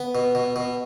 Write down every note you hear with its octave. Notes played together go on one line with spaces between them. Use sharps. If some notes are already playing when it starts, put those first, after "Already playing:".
Already playing: B3
B2
B2
B2